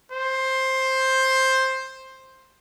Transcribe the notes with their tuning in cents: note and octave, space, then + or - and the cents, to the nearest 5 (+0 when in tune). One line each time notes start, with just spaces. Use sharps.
C5 +10